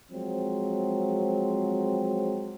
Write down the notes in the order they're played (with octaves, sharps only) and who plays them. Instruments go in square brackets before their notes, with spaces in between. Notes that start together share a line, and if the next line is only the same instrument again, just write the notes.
[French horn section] F3 F#3 G#3 C4